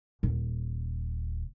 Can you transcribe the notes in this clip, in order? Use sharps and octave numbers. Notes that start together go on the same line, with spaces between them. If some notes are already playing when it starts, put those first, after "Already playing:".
D#1